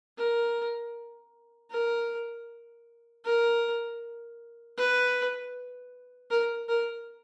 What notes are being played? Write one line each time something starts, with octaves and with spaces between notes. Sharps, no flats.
A#4
A#4
A#4
B4
A#4
A#4